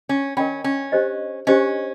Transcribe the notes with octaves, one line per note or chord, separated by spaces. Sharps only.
C#4
C#4 A#4 D#5 G5 B5
C#4
D4 G4 C5 D#5
C#4 D4 G4 C5 D#5